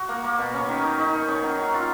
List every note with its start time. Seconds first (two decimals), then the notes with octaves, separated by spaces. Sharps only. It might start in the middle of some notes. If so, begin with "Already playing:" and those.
Already playing: F#4
0.09 A#3
0.24 A#3
0.38 B2
0.54 C#4
0.69 D#3
0.83 D#4
0.99 D#4
1.13 D#3
1.28 C#4
1.43 F#3
1.58 F#3
1.74 F4